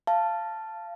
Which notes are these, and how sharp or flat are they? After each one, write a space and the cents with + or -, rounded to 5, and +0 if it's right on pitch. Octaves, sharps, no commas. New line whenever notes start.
F5 -20 A5 +0